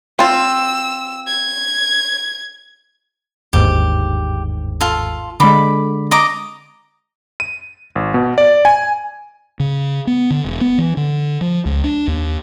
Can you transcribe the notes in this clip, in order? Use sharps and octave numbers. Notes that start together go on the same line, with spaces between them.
C4 F4 E6
G#6
G1 D#2 G#2 G4
F4 A4
D3 G#3 B5 D6
D#5 A#5 D6
D#7
G#1
B2
D5
G#5
C#3
B3
D3
E1
B3
E3
D3
F3
C#2
D4
D#2